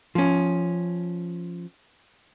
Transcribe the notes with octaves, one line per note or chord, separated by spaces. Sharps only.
F3 C#4